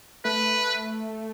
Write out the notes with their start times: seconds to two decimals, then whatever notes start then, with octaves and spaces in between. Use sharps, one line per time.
0.25 A3 B4